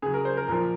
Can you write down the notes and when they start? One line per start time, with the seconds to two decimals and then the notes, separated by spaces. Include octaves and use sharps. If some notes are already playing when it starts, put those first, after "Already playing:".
0.02 C#3 F#3 G#4
0.14 A#4
0.25 C5
0.37 A#4
0.48 A#2 F3 A#4